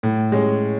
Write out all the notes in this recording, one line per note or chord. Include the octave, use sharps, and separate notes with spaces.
A2
G#3 C#4